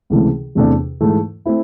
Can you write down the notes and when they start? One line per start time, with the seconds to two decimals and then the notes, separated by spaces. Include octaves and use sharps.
0.10 C#2 C3 E3 A3
0.55 E2 C3 E3 A3 D4
1.00 G#2 E3 A3
1.46 A3 C4 E4